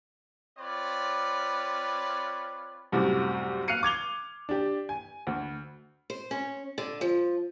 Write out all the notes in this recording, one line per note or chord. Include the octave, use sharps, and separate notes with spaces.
C4 F4 B4 C#5 D5
C2 F#2 A2 C3
F5 F6 F#6 C7 C#7 D#7
D6 G#6 F7 G7
D4 G4
G#5
D2
C5
C#4
D3
F3